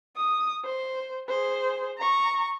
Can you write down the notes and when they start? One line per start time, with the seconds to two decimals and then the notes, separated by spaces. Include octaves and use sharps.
0.16 D#6
0.65 C5
1.29 G#4 C5
1.98 A#5 C#6